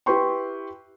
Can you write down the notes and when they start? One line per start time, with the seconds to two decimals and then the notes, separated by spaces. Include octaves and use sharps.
0.06 E4 G4 B4 G5 C6 C#6